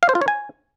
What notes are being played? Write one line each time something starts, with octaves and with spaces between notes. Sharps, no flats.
F5
C5
F4
C#5
G#5